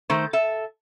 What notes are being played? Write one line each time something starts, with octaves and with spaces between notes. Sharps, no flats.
D#3 A3 C5
A4 E5